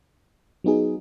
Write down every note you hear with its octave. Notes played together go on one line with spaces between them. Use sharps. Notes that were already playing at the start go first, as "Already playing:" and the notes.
F#3 B3 D#4 G#4